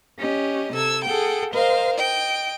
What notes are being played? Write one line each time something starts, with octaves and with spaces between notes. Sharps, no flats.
C#4 G4 D#5
C3 A4 E6 G#6
G#4 A4 F#5 G5
A#4 C5 D#5 F5
D#5 G5